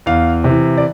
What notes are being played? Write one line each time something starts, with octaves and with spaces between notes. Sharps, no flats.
E2 F5
C3 E3
D5